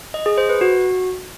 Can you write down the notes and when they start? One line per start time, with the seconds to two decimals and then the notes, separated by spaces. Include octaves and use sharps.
0.14 D#5
0.26 G#4
0.38 C5
0.49 B4
0.61 F#4